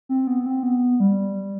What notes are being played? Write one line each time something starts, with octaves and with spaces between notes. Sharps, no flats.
C4
B3
C4
B3
G3
G3